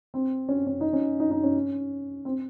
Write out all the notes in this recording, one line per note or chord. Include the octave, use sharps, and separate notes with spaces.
C4
C#4
C#4
D#4
C#4
D#4
D#4
C#4
C4